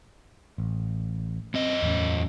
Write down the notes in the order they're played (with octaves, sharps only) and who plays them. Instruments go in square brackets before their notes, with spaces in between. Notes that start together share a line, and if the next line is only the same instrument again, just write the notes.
[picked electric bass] A1
[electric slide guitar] F#2 D#5 [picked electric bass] C4
[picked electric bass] E2 A2 C#4